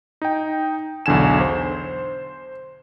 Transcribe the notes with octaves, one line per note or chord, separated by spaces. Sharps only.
D#4 G5
B1 E2 D3 G#5 E7
C5